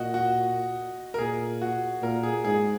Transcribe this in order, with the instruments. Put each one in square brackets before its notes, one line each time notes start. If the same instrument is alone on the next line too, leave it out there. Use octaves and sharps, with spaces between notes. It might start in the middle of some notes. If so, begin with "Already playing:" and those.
Already playing: [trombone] A#2 [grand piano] F#4 D#5
[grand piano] F#4
A#4
[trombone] A#2 [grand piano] G#4
[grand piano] F#4
[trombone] A#2 [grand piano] A#4
[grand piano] G#4
[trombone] G#2 [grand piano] G#4